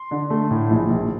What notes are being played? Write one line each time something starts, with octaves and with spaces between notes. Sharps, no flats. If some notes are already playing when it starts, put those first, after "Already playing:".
Already playing: C6
D3
A3
A2
A#1
A#1